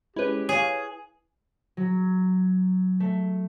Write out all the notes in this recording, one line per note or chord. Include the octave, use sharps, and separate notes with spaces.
G#3 C#4 E4 G4 B4
G#4 C#5 F5
F#3
A3